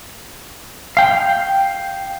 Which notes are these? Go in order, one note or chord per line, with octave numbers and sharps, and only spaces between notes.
F5 G5